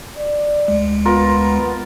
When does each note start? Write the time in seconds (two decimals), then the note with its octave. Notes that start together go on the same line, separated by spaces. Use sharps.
0.17 D5
0.68 D2 G#3
1.05 B3 F4 A#4